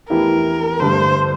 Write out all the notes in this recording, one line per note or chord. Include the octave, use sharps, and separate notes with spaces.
E2 E3 A3 E4 G4 A#4
G2 D3 A3 C5